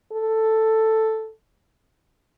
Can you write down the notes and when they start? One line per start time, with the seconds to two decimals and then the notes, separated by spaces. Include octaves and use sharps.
0.12 A4